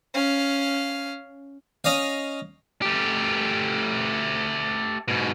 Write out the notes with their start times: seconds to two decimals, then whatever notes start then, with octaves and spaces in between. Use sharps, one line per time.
0.14 C#4 F5
1.84 C#4 D#5 F5
2.82 A3 G4
5.08 G#2 B2